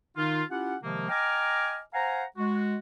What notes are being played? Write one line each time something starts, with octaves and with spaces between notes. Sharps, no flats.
D#3 D#4 F4
C#4 E4 F4 G4 F#5
C3 D#3 F3 G#3 A#3
D#5 G5 G#5 A#5 D6 F6
C5 F5 F#5 G#5 A#5
G#3 F#4